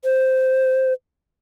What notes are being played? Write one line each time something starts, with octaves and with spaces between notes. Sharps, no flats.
C5